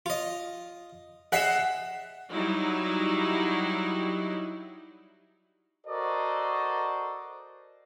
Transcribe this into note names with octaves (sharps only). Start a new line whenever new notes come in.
F4 D#5
G#4 D#5 E5 F#5 C7 E7
F#3 G3 D#4 E4
F#4 A4 A#4 C5 D5 D#5